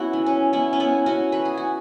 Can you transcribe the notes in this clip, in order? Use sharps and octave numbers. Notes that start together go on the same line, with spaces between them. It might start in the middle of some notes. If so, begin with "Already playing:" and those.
Already playing: B3 C#4 E4 F#4
E3
C#4
E3 B3 E4
C#4
B3 E4
B3
C#4 F#4
E3 B4
G#4
F#4